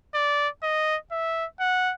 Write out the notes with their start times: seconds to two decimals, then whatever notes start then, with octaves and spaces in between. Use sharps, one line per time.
0.14 D5
0.63 D#5
1.11 E5
1.60 F#5